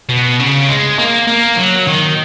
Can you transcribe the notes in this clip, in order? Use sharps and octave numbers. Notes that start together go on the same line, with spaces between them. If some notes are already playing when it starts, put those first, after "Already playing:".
B2
C#3
G#3
A#3
A#3
F#3
D#3